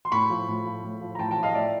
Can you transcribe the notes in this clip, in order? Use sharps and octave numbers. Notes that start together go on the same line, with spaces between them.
C6
A2 B5 C#6
F3
A2
F3
A2
F3
A#5
A2 G5 A5
G5 A5
F3
D#5 F5
A2 D5 E5